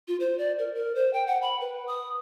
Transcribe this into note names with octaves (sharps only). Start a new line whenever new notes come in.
F4
C5
D5
A#4
A#4
C5
G5
F#5
B5
B4
D#6